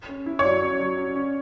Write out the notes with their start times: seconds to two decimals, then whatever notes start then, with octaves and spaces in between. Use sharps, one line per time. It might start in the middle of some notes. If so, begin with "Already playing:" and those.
0.08 C#4
0.26 E4
0.39 C#5
0.44 F#3 D5
0.62 C#4
0.80 F#3
0.98 C#4
1.16 C#4